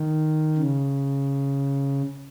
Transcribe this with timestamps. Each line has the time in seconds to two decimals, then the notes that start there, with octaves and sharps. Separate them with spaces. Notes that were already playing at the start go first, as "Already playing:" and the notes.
Already playing: D#3
0.58 C#3